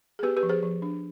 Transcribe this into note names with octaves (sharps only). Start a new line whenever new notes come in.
G#4
B3 G4 B4
G4 B4
F3
G#4 C5
F3
D4